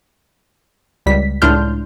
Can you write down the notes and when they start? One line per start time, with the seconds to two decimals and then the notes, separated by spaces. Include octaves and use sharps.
1.06 C#2 G3 B6
1.42 C#2 A2 D4 C6 F6 G6